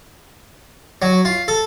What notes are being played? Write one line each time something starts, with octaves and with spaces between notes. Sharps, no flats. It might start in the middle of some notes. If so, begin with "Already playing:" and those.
F#3
F4
A4